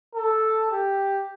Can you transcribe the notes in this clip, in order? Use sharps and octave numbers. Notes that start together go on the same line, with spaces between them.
A4
G4